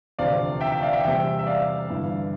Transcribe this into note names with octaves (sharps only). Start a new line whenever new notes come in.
E1 D2 C3 F3 D5 F5
E5 G5
E5 G5
D5 F5
E5 G5
E2 C3 G3 E5 G5
E5
D5 F5
G1 G2 E3